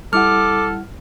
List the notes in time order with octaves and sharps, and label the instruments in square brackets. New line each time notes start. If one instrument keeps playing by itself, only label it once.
[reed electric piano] G3 E4 F#5 [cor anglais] A4 [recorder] D6 [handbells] F6